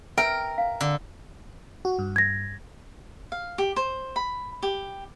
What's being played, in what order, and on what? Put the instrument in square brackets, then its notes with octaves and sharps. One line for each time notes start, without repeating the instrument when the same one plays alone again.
[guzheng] A#4 [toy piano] B4 E5 E6 [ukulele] G5
[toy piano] F5
[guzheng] D3
[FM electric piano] F#4
G2
[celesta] G#6 A#6
[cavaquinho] F5
G4
C5
B5
G4